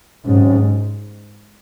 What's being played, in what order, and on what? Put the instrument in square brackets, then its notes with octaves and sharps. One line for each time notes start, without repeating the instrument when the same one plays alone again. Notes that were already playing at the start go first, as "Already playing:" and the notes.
[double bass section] G#2 [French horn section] C3 D#3 F#3 C#4